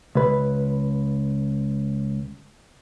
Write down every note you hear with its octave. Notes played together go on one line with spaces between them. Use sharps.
C#2 B4